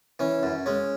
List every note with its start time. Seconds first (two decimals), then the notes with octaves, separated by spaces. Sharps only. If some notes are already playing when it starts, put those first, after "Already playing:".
0.19 E3 C#4
0.43 F#2
0.66 G#3 C#4